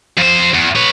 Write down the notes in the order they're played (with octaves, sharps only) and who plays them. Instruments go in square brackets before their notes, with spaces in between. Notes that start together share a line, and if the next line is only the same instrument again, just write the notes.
[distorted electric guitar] F2 C5
E2
B4 C#5